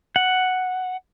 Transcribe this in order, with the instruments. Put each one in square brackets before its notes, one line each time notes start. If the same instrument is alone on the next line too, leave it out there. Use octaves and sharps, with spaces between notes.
[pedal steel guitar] F#5